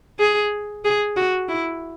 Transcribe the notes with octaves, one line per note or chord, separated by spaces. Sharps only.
G#4
G#4
F#4
E4